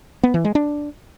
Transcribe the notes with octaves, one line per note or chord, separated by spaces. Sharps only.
B3
E3
G#3
D4